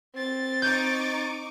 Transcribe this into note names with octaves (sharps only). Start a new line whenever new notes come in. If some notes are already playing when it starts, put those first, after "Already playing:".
C4 A6
D#4 C#6 D6 G6